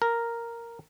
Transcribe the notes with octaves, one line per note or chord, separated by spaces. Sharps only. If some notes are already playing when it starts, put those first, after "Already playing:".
A#4